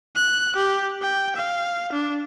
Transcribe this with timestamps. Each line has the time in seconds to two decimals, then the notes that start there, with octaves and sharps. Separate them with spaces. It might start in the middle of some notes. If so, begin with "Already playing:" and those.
0.15 F#6
0.56 G4
1.02 G5
1.35 F5
1.92 D4